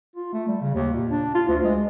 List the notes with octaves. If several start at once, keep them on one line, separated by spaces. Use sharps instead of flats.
F4
A3
G3
C#3
D#2
A#2
D4
F4
D2
G#3